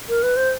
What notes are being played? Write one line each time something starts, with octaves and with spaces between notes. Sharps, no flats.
A#4
B4
C5